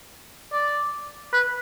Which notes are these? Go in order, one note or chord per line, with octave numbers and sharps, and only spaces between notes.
D5
B4